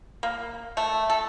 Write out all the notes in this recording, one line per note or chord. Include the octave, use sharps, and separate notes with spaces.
A#3
A3
A4